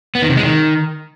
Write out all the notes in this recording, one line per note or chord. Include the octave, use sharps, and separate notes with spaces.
B3
D#3
C3
G#3
D#3